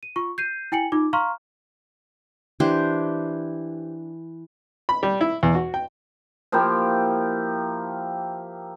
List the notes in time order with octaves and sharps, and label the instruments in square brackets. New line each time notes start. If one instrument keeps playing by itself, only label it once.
[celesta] D#7
F4 C#6
G6 C7 D#7
E4 G5 G#5 C#7 F#7
D#4 F4 D6
F5 A#5 C6 C#6 F6
[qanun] E3 D4 G4 C5
[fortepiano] B5
G3
E4
E2
F#4
G5
[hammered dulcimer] F3 A#3 E4 G4